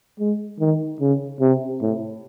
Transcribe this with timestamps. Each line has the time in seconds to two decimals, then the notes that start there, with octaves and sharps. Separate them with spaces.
0.20 G#3
0.60 D#3
1.01 C#3
1.41 C3
1.82 A2